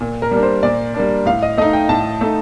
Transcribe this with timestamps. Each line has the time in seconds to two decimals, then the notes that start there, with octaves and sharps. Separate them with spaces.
0.01 A#2
0.22 A#4
0.31 G3 A#3 D4
0.43 C5
0.63 A#2 D5
0.94 G3 A#3 D4
1.26 A2 F5
1.43 D#5
1.58 A3 D#4 D#5
1.73 G5
1.89 A2 A5
2.21 A3 D#4